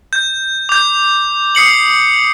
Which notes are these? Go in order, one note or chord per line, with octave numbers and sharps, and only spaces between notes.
G6
D6 G6
D#6 C7 C#7 F#7